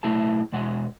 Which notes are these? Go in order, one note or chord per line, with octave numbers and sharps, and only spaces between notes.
B1 A3 E4 G#4 A5
E2 B2 G#3 F#5